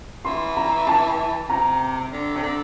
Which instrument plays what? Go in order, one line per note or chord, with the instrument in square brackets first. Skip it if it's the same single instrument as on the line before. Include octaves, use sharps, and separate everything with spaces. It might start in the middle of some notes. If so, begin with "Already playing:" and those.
[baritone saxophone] E3 [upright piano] C6
[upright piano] A#5
A5
[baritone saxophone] C3 [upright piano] A#5
[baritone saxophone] D3
C3
D3